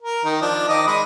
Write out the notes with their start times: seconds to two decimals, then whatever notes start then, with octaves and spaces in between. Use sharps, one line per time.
0.02 A#4
0.25 D#3 D#4
0.42 F3 D4
0.69 D#3 D#5 D6
0.87 G#3 D#5 B5